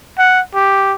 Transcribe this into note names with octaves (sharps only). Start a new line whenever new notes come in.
F#5
G4